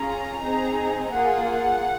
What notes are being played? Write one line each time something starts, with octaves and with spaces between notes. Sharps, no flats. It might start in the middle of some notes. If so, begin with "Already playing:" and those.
Already playing: C#4 F4 G#4 A#5
C4 D#4 G#4
A#3 F4 G#4 F#5